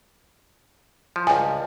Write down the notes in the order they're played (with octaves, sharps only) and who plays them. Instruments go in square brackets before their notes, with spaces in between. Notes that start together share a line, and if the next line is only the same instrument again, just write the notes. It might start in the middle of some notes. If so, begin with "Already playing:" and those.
[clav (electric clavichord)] F3
[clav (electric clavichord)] C#2 G2 [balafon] G#5